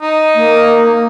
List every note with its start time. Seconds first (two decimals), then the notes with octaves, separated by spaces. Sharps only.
0.02 D#4
0.35 A#3